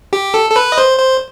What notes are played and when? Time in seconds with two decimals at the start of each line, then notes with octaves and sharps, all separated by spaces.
0.13 G4
0.34 A4
0.50 A4
0.56 B4
0.72 D#5
0.78 C5
0.98 C5